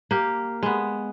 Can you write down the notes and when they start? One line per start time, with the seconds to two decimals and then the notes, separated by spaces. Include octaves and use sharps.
0.11 A#3 G4
0.63 G#3 B3